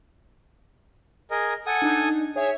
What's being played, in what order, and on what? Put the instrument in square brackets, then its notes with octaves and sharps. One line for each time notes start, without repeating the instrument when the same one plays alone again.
[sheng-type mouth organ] G#4 A#4 D#5
[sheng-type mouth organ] A4 G#5 D#6 [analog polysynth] F#5
[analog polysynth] D4 D#4
[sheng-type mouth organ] G#4 [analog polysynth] C#5 E5